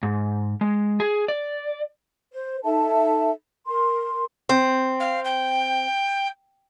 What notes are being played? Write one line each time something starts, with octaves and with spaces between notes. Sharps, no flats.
G#2
G#3
G#4
D5
C5
D#4 A4 E5 A5
A#4 C6
C4
F5
G5